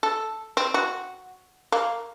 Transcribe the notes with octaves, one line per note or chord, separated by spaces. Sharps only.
A4
C4
F#4
A#3